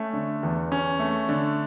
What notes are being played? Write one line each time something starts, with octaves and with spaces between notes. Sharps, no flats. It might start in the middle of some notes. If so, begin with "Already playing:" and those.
Already playing: A3 C#4
D3
E2
C#4
A3
D3